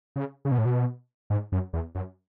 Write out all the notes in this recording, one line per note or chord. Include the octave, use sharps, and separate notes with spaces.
C#3
C#3
B2
A2
B2
G#2
F#2
E2
F#2